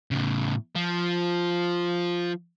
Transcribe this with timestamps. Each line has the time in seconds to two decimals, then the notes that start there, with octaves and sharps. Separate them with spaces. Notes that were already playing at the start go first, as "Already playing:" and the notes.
0.11 A2 C#3
0.76 F3